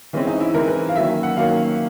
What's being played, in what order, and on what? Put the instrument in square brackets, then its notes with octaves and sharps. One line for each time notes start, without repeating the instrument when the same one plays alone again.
[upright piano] E3 G#3 C4 C#4
D#4
E4
E3 G#3 C4 A#4
B4
F5
D#3 F#3 A#3 C#4 E5
F#5
D#3 F#3 A#3 C#4 F5